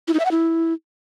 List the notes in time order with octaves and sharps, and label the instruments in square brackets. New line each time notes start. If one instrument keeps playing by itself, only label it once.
[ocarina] E4
D#4
E5
F#5
E4